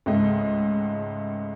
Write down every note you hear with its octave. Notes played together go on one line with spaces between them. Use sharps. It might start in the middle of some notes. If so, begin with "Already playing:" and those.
C#2 G#2 A3 D#5